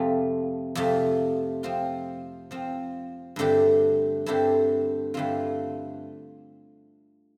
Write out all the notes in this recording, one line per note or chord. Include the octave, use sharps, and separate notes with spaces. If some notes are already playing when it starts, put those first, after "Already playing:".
Already playing: F2 C3 A3 F4
F2 C3 A3 F4
F3 C4 F4
F3 C4 F4
G2 D3 A3 C4 G4
G2 D3 A3 C4 G4
G2 D3 A3 C4 F4